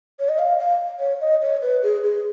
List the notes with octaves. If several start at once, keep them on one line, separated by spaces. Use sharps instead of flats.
C#5
D#5
F5
F5
C#5
D#5
C#5
B4
G#4
G#4